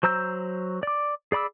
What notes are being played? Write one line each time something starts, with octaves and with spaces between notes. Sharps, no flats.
F#3 C5 A#5 E6 G6
D5 D6
G#4 D5 B5 D6 E6